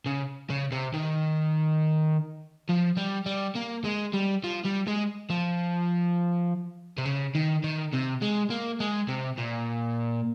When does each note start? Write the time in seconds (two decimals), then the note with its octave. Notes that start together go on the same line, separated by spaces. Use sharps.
0.06 C#3
0.50 C#3
0.72 C3
0.94 D#3
2.69 F3
2.97 G3
3.26 G3
3.56 A#3
3.85 G#3
4.14 G3
4.44 F3
4.65 G3
4.87 G#3
5.30 F3
6.98 C3
7.05 C#3
7.35 D#3
7.64 D#3
7.93 C3
8.22 G#3
8.50 A#3
8.80 G#3
9.08 C3
9.38 A#2